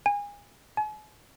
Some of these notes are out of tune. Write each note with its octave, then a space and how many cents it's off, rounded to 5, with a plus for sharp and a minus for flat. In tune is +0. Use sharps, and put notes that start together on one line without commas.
G#5 -30
G#5 +45